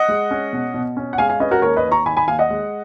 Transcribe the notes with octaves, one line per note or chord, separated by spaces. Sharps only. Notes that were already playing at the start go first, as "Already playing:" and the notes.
Already playing: D#5 F#5
G#3
C#4
B2
B2
C#4
F#5
G#3 F5 G#5
F5 G#5
C#4 B4 D#5
F#4 A#4
D#2 A#4 C#5
B4 D#5
D#2
A#5 C#6
D#3 G#5 B5
G#5 B5
D#2 F5 G#5
D#5 F#5
G#3